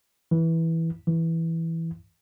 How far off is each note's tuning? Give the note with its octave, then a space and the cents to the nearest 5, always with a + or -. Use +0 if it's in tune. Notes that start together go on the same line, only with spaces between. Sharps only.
E3 -10
E3 -5